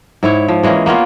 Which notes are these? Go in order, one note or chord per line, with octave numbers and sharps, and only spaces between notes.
G#2 E4 C#5
F3
E3 G#3 A#3 C#4
A#3 B3 C#4 F4